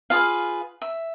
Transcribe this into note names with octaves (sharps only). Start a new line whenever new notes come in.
F4 G#4 B4 F5
E5